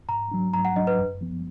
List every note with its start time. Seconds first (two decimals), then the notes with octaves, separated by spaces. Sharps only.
0.09 G#2 A#5
0.31 F#3 D4
0.54 G#2 A#5
0.65 F#5
0.76 F#3 D4 D#5
0.87 B4
0.98 F#2
1.21 F3 B3